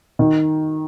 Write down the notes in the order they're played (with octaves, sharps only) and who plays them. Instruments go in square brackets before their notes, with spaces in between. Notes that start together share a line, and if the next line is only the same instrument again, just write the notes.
[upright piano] D#3